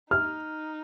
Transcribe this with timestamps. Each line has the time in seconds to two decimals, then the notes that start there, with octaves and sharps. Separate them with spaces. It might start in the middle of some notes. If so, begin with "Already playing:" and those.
0.11 D#4 F6